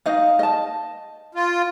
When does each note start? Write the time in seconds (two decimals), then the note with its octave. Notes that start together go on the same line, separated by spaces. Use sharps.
0.06 D#4 D#5 F5
0.39 D#5 A5
1.35 F4